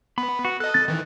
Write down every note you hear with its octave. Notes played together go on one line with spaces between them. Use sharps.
B3 B5
F#4
A4 D#5 F#6
A6
D#3 E3